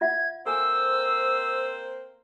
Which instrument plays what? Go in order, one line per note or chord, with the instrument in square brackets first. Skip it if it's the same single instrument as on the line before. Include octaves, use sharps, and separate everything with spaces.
[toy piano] F4 E5 F#5 [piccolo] G#6
[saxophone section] A#3 C4 C5 [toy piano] A4 G#5 D6 [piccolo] E6